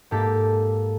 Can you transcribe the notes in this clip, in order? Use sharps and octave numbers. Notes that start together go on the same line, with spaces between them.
G#2 A#3 G4 A4 B6